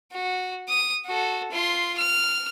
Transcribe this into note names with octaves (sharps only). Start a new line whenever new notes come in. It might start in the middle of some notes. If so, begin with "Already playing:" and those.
F#4
D#6
F#4 A4
F4 C6
F6